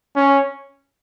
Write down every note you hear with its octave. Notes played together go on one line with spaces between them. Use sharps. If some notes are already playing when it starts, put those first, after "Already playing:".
C#4